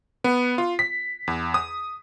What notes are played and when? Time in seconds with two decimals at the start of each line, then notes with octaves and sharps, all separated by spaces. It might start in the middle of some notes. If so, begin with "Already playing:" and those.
0.24 B3
0.58 F4
0.79 B6
1.27 E2
1.54 D#6